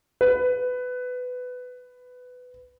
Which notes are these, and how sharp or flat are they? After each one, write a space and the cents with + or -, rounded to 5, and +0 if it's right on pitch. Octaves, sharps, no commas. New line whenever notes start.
B4 +15